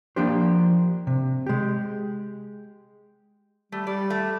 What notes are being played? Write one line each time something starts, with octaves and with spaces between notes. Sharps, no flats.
F3 A#3 D4 G4 C5
C3
G#3 G4
G3 A3
G3 D5
A3